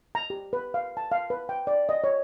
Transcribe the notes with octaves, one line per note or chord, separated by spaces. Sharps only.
A#5
G4
B4
F5
A5
F5
B4
G5
D5
D#5
C#5